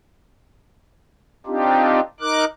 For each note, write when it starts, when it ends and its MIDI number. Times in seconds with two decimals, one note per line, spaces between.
1.46 2.00 60
1.46 2.00 62
1.46 2.00 63
1.46 2.00 65
1.46 2.00 67
2.20 2.45 63
2.20 2.45 70
2.20 2.45 86
2.20 2.45 90